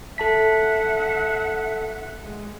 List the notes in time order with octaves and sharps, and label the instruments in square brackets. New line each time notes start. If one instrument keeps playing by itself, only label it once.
[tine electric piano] A4 A5 B6 [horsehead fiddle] E5 F#5
[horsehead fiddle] G#3